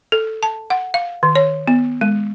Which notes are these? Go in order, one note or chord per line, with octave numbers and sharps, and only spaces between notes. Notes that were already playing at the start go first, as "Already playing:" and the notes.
A4
A5
F#5
F5
D#3
C#5
B3
G#3